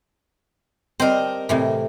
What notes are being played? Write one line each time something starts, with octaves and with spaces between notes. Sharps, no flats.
G3 C4 A#4 D#5 A5
A2 C3 E3